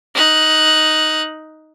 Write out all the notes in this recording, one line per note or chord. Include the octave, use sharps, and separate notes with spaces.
D#4 F#6